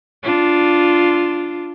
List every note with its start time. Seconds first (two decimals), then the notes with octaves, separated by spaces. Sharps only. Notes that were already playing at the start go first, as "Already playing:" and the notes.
0.23 D4 F4